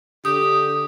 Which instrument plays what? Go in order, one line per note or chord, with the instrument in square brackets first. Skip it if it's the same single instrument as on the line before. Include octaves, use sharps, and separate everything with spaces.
[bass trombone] D3 [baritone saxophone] G4 [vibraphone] D#6